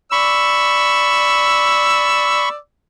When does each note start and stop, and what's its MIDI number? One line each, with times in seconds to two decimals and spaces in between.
0.12 2.56 74
0.12 2.49 83
0.12 2.49 85
0.12 2.56 88